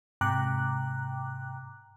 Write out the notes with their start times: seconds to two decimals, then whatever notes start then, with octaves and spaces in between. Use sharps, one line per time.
0.21 G#2 C3 G5 A#5 D6 F#6